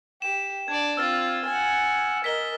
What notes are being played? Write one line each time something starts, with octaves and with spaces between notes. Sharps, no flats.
G4 E7
D4 D5 G#6
C4 F4 E6 F6 A6
F#5 G#5
A#4 D#5 B6 G7